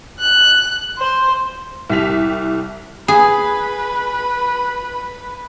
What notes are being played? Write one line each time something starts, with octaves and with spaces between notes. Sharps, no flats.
F#6
C5
C2 G4 B6 F7
G#4 B4